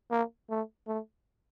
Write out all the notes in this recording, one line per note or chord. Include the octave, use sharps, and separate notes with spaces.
A#3
A3
A3